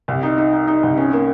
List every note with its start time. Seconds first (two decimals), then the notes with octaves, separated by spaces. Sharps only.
0.08 C2
0.23 D#4
0.38 D#4
0.53 D#4
0.68 D#4
0.83 C2
0.97 C#4
1.13 A#3